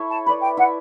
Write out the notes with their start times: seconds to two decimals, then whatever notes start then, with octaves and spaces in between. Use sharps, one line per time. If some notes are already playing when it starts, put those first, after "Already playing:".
Already playing: E4 A4 C#5 E5
0.10 A5
0.25 B4 D5 B5
0.42 G5
0.57 E4 F#5